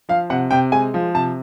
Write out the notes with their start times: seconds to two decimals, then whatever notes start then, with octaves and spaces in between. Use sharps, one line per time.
0.09 F3 F5
0.30 C3 F#5
0.51 C3 G5
0.72 G#3 G#5
0.94 F3
1.14 C3 A5